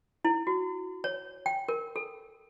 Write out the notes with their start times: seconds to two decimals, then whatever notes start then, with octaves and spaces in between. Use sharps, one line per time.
0.25 E4
0.47 F#4
1.04 C#5
1.46 G5
1.68 A#4
1.96 A4